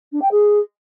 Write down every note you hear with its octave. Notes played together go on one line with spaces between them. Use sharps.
D4
G5
G#4